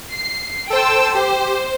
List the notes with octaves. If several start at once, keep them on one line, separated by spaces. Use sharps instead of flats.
C7
A4 C5 G5 A5 E6
G4 C5